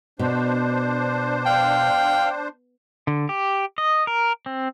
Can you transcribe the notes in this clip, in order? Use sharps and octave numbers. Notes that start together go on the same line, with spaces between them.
B2 D4 C5
F5 G5
D3
G4
D#5
A#4
C4